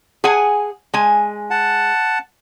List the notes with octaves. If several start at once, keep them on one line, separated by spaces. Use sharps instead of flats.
G#4 F#5 G#5
G#3 G#5
F#5 A5